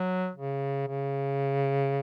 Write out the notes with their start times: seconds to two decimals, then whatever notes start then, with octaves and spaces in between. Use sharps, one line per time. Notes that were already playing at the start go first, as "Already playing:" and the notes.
Already playing: F#3
0.35 C#3
0.87 C#3